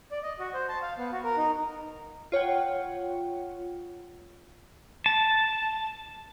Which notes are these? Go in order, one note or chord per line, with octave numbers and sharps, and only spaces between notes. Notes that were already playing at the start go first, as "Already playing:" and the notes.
D5
D#5
F#4
C5
A5
F5
B3
F#4
A#4
D#4
F4 C#5 F#5 G5
A5